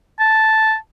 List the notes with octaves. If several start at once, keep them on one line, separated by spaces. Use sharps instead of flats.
A5